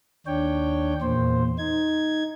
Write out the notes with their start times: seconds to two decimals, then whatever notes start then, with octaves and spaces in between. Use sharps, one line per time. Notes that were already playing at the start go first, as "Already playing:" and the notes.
0.27 D#2 D4 C#5 G5
1.02 E2 A#2 C5
1.58 D#4 G#6